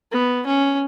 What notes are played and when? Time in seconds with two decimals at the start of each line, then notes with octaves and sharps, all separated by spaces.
0.12 B3
0.46 C#4